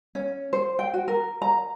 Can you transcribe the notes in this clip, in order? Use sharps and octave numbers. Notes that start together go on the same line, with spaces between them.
C#4
C5
G5
F#4
A#4
A#5